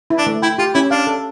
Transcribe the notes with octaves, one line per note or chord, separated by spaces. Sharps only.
E4
D4
A3
E4 G5
F4 G4
C#4 E4
D4 F5
A4